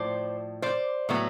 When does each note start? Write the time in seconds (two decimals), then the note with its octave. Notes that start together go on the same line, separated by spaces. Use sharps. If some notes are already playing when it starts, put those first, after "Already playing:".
Already playing: A2 F3 C5 D5
0.62 C5 D5
1.09 A2 F#3 B3